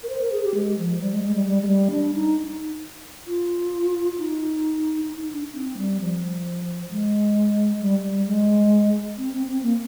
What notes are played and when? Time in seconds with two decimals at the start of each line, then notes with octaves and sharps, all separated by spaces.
0.03 A#4
0.09 C5
0.21 A#4
0.32 G#4
0.44 G4
0.55 G#3
0.78 F3
1.01 G3
1.12 G#3
1.24 G#3
1.35 G3
1.45 G3
1.62 G#3
1.68 G3
1.91 D4
2.14 D#4
3.27 F4
4.19 D#4
5.09 D#4
5.21 D#4
5.33 D4
5.54 C4
5.77 G3
6.01 F3
6.91 G#3
7.81 G3
8.11 G3
8.27 G#3
9.18 C4
9.33 C4
9.47 C4
9.63 A#3